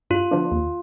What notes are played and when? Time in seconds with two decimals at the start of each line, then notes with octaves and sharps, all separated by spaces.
0.10 G2 F4
0.31 D3 F3 B3 D4
0.51 D#2